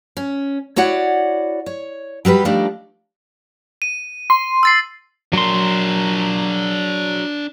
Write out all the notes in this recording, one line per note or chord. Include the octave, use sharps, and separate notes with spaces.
C#4
E4 F#4 C#5 D5 F#5
C#5
F#3 G3 G4 B4
F3 G3 A3 D4 D#4
D#7
C6
E6 A6 C7
F#3 D4 A#4 C6